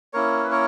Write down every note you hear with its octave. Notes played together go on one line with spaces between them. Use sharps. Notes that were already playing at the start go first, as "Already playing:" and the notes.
A#3 C#4 E4 A#4 C#5
B4
A#4 C#5